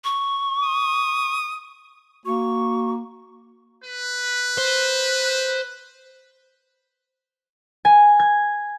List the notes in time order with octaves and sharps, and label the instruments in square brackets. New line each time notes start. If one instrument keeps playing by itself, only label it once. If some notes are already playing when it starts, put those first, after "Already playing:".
[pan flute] C#6
[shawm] D#6
[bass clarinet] A#3 [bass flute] F#4 [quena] C#6
[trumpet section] B4
[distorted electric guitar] C5
[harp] G#5
G#6